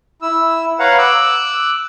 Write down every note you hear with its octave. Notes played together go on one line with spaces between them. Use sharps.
E4 E6
B4 C#5 F5 F#5 A#5
D6 E6 F#6